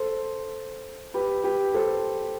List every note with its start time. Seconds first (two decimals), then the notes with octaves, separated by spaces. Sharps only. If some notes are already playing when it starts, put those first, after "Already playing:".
Already playing: A4 C5
1.14 G4 B4
1.44 G4 B4
1.74 A4 C5